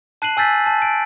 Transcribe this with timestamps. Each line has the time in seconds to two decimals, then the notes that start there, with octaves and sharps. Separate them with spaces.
0.22 A5 F#6 C7 D#7 F#7
0.37 G#5 E6 G6 A6 B6
0.66 A5
0.82 D7